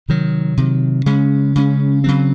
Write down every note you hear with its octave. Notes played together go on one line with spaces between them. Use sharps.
C3 D#3 F#3
C3 D#3 F#3
C#3 G#3 C#4
C#3 G#3 C#4
C#3 F#3 C4